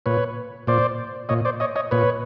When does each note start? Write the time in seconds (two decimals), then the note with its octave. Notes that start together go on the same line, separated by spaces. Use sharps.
0.06 A#2 B4 C#5
0.67 A#2 C5 D5
1.29 A#2 C#5 D#5
1.45 C5 D5
1.60 C#5 D#5
1.76 C#5 D#5
1.91 A#2 B4 C#5